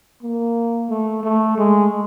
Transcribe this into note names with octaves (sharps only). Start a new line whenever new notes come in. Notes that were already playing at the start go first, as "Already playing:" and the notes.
A#3
A3
A3
G#3